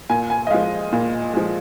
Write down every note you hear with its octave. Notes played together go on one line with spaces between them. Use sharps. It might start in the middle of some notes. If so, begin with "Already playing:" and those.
A#2 G#5
G#5
D#5
F3 G#3 F5
A#2
F3 G#3